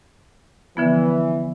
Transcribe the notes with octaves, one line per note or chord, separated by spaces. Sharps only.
D3 E3 F3 B3